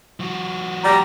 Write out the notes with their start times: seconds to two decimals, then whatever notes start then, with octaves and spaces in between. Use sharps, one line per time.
0.20 F3 F#4
0.83 G3 A#5